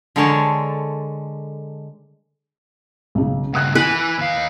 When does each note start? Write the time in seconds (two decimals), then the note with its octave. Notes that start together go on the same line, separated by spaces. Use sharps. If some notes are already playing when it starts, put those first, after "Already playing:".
0.16 D3 G#3 A4 A#4 C#5 A5
3.15 B1 C#3
3.53 G2 C#3 F#5 D#6 F#6
3.75 E3 B4 G#5
4.18 D#2 F5